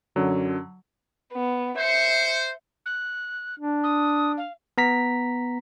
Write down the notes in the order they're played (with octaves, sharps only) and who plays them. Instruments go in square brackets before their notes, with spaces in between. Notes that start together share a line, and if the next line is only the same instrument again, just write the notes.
[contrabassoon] F#2 [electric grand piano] D3 F#3
[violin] B3
[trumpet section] C5 [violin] E5 C#7
[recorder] F#6
[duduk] D4
[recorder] D#6
F5
[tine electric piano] B3 A#5 B6